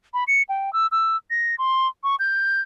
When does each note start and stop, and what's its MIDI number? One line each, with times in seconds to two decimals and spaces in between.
0.14 0.24 83
0.27 0.42 97
0.49 0.72 79
0.73 0.87 88
0.91 1.16 88
1.30 1.55 94
1.58 1.88 84
2.04 2.16 85
2.19 2.60 91